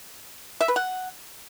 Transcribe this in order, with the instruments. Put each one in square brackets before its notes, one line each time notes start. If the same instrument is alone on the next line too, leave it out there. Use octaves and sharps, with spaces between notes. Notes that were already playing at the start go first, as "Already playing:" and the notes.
[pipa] E5
B4
F#5